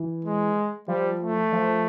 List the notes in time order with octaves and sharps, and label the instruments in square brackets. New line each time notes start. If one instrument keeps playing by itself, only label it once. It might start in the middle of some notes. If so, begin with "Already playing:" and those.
Already playing: [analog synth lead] E3
[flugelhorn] G#3
[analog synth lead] F3 [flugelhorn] G3
[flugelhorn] A3
[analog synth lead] F3